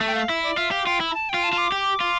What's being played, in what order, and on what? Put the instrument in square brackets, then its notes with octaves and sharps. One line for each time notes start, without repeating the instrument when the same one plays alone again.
[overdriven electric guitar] A3
[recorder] G5
F5
[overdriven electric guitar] E4 [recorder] E5
[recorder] D5
[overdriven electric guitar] F4 [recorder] E5
[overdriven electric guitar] G4 [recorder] F5
[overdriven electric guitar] F4 [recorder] G5
[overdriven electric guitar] E4
[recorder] A#5
A5
[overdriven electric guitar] F4 [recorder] G5
[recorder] A5
[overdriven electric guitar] F4 [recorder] D6
[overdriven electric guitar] G4
F4